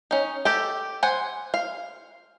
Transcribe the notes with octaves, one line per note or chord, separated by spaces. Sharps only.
C#4 D#4
G4 A4 G5
C5 F#5 G#5
F5